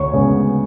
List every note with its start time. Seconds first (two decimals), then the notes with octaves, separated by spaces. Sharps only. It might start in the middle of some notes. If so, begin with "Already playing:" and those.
Already playing: D2 C#5 C#6
0.13 C#3 G#3 B3